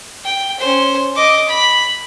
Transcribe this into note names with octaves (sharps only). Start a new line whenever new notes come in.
G5
C#4 C5
D#5 D6
B5